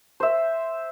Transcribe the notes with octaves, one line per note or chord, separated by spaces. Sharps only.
C5 E5